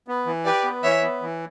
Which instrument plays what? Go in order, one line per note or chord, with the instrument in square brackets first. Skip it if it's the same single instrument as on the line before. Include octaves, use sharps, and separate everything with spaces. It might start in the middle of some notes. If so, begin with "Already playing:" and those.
[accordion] B3
E3
[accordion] G4 [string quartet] B4 D5
[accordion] B3
[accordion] E3 [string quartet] C#5 E5
[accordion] B3
E3